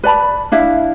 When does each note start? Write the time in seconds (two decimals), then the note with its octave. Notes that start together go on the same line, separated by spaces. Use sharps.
0.03 B4 D5 A5 B5
0.52 D4 E4 E5 F5